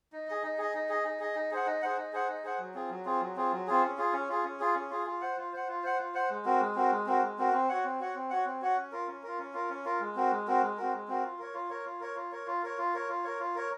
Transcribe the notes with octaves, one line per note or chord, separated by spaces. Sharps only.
D#4
G#4 D#5
D#4
G#4 D#5
D#4
G#4 D#5
D#4
G#4 D#5
D#4
G#4 C5 F#5
D#4
G#4 C5 F#5
D#4
G#4 C5 F#5
D#4
G#4 C5 F#5
F#3
C4 F4 G#4
F#3
C4 F4 G#4
F#3
C4 F4 G#4
F#3
C4 F4 G#4
C#4
F4 G#4
C#4
F4 G#4
C#4
F4 G#4
C#4
F4 G#4
F4
C5 F#5
F4
C5 F#5
F4
C5 F#5
F4
C5 F#5
G#3
C4 F#4 A#4
G#3
C4 F#4 A#4
G#3
C4 F#4 A#4
G#3
C4 F#4 A#4
C4
F#4 C#5 F#5
C4
F#4 C#5 F#5
C4
F#4 C#5 F#5
C4
F#4 C#5 F#5
C#4
F4 A#4
C#4
F4 A#4
C#4
F4 A#4
C#4
F4 A#4
G#3
C4 F#4 A#4
G#3
C4 F#4 A#4
G#3
C4 F#4 A#4
G#3
C4 F#4 A#4
F4
A#4 C#5
F4
A#4 C#5
F4
A#4 C#5
F4
A#4 C#5
F4
A#4 C#5
F4
A#4 C#5
F4
A#4 C#5
F4
A#4 C#5